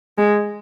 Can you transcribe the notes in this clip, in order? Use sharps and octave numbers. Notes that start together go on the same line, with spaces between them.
G#3